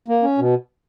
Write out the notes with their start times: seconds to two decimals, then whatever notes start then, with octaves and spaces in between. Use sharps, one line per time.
0.08 A#3
0.23 C#4
0.38 B2